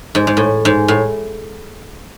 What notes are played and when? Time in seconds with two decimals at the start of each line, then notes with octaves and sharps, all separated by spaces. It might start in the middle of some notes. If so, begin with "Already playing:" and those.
0.15 G#2
0.27 G#2
0.37 A2
0.65 G#2
0.88 A2